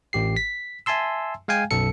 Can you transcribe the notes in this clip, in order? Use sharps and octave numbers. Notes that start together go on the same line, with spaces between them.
A1 G4 C7
B6
E5 G#5 A5 C6 E6
G#3 F5 G5 G#5
B1 F#2 A4 C#7